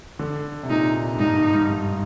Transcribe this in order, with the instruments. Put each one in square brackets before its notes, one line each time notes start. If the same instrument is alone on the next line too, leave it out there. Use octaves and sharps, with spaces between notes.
[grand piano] D3
C3
[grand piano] A#2 [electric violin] D#4
[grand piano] G#2
[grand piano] G2 [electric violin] D#4
[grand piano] G#2
G2
G2